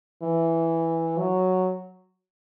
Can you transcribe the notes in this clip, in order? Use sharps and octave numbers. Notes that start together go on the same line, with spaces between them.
E3
F#3